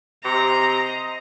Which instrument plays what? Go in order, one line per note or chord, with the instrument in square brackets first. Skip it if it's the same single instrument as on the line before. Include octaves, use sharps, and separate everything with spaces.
[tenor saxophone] C3 [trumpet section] D#5 C6 [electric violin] A#5